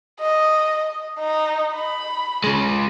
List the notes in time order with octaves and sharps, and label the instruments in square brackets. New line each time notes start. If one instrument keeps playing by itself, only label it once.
[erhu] D#5
D#4
B5
[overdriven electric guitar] C#3 G#3